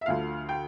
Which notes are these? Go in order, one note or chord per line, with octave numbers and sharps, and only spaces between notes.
E5
D2 D3 F3 F5
G5